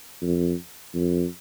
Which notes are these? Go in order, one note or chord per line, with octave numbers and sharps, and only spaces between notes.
F2
F2